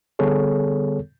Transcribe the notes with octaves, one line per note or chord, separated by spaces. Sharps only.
D3 G3 B3 G#4 A4 C#5